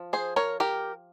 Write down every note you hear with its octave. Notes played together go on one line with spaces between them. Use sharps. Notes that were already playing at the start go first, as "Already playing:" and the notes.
Already playing: F3
G#4 C5
A#4 C#5
G4 A#4